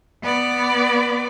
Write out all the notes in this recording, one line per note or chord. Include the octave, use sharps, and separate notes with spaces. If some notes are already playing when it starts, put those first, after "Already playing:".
B3 D5